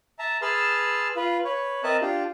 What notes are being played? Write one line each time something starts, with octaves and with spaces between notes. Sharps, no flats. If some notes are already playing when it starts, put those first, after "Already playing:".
E5 A5 A#5
G#4 B4 A5 C6 E6 F6
F4 B4
B4 C#5
C4 A#4 D#5 E5 A5 F#6
D4 F4 G4